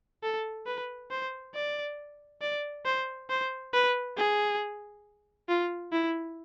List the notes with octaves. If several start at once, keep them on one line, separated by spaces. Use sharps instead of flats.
A4
B4
C5
D5
D5
C5
C5
B4
G#4
F4
E4